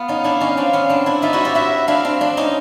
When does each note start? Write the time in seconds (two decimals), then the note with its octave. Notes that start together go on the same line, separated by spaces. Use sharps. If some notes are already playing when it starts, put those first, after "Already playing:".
Already playing: B3 F4 F5
0.08 C#4 D#4
0.24 D4 E4
0.40 C#4 D#4
0.57 C4 D4
0.73 B3 C#4
0.89 C4 D4
1.06 D4 E4
1.22 D#4 F4 E5
1.33 E4 F#4
1.44 F4 G4
1.55 E4 F#4 E5
1.88 D4 E4 F5
2.05 C4 D4
2.21 C4 D4
2.37 C#4 D#4